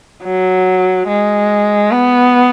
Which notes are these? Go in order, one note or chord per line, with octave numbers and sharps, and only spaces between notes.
F#3
G#3
B3